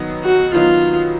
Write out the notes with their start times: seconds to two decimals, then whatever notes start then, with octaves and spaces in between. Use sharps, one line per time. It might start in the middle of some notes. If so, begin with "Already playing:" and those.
Already playing: D#3 F#3 B3 D#4
0.23 F#4
0.54 D#3 F#3 B3 D#4 F4